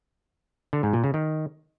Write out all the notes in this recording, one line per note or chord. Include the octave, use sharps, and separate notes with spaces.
D3
G#2
A#2
C#3
D#3